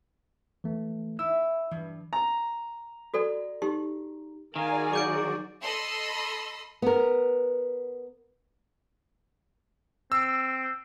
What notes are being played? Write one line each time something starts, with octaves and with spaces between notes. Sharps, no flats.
E3 A3
E4 E6
G2 E3
A#5
F#4 A4 D5
D#4 G4 C6
D#3 F#4 G#4 A#4 D5 F5 G#5
F#3 D6 G6 D7
A4 D#5 B5 C6 E6
B3 A#4
C4 E6